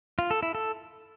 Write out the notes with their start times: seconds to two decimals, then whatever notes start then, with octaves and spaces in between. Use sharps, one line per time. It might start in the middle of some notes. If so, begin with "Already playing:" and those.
0.19 F4
0.31 A4
0.43 E4
0.55 A4